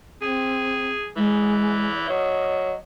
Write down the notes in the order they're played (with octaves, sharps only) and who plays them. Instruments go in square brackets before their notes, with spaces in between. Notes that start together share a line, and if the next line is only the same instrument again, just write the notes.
[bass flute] C4 [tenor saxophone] G#4
[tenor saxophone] E3 [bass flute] G#3
[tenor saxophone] F#3 [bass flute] D#5